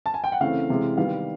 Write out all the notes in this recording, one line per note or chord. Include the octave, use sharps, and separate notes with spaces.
A5
G#5
G5
F#5
C#3 E3 A3 C4 F5
C3 E3 G#3
D#3 G3 B3 F5